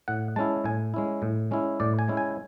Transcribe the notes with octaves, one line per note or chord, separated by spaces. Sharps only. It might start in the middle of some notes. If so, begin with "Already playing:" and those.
A2 F#5
G#3 C#4 E4 A5
A2 G#5
G#3 C#4 E4
A2
G#3 C#4 E4
A2 D5
G#5
G#3 C#4 E4
G#5